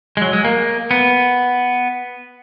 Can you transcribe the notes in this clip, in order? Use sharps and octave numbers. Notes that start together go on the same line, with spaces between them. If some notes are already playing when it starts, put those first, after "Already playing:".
G#3
F#3
G#3
A#3
B3